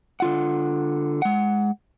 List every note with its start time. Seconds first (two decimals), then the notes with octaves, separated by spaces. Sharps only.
0.20 D3 F4 F#5
1.22 G#3 F#5